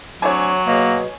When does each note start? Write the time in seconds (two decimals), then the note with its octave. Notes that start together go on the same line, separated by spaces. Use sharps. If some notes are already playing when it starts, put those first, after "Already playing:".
0.22 F#3 A3 C4 D4 C#5 G#5
0.67 B2 A#3 G#4